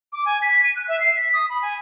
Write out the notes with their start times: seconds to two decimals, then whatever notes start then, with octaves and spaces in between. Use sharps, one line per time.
0.13 D6
0.25 G#5
0.42 B6
0.64 D#7
0.76 F#6
0.88 E5
1.00 C7
1.16 B6
1.34 D#6
1.50 B5
1.62 G#5